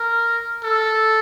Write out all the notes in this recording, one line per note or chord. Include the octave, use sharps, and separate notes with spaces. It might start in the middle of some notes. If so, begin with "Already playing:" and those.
Already playing: A#4
A4